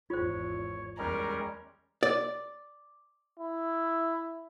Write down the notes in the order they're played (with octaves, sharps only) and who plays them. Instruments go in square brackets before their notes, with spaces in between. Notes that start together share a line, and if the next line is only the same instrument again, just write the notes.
[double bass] G#1 E2 [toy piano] F4 C5 [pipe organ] C#5
[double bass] E2 [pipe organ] G3 G#3 C#4 [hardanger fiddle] A#4
[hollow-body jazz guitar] D5
[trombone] E4